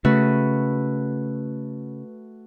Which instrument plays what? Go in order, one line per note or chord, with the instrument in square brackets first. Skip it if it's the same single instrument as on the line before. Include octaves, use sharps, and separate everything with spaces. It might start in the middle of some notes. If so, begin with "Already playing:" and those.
[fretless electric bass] C#3 [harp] A3 F#4 B4